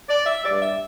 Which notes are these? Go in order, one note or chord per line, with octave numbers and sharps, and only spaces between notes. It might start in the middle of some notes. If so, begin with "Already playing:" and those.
D5
E5
G2 G3 D5
E5